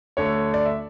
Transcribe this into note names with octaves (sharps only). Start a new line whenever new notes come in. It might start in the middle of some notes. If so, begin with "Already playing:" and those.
D2 D3 A3 C#5
D5
E5